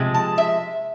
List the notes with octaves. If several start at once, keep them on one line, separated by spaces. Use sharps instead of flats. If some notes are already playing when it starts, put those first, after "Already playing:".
Already playing: C3 F3 G#3
A5
E5